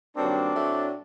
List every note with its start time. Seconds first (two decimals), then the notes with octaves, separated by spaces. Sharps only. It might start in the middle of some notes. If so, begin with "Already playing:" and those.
0.16 G2 D#3 F#3 A#3 C4 D4
0.54 A2 F#3 A3 C4